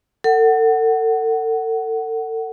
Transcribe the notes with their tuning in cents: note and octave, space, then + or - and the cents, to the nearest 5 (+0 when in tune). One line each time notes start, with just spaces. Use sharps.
A4 +35 F#5 +15